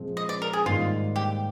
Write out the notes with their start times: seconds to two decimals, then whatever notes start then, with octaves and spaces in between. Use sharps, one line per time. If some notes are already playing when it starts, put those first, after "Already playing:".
Already playing: A#2 F3 G#3 C4
0.17 D#5
0.29 D5
0.42 A#4
0.53 G#4
0.66 G#2 D#3 G3 A#3 D#4 F4
1.16 G4